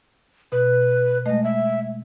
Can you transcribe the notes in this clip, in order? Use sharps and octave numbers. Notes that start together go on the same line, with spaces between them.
B2 B4
G#3 A3 D#5
E5